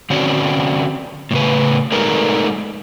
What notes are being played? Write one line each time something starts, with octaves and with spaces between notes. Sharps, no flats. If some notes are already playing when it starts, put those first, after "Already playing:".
D3 C4 C#4 F#4 D5
A2 C#3 B4
G#3 A3 D#4 A#4 B4 D5